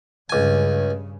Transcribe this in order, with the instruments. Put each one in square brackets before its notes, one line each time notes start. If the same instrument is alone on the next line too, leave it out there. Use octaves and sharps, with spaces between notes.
[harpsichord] C#2 G#5 [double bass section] G2 C#3